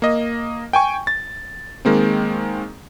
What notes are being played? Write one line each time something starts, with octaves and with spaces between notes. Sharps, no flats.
A#3 D#5
G5 G#5 C#6
A6
D#3 G#3 A#3 C4